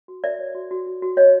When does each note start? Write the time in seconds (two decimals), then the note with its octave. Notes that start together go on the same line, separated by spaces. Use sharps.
0.08 F#4
0.24 A#4 D5 E5
0.39 C#5
0.55 F#4
0.71 F#4
0.87 F#4
1.02 F#4
1.17 C#5 D#5